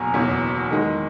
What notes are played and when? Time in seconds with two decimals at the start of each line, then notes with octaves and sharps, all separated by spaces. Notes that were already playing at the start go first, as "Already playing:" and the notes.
Already playing: F#1 E2 B2 F#3 G#5 A#5
0.14 F#1 E2 B2 F#3
0.69 E2 D#3 G#3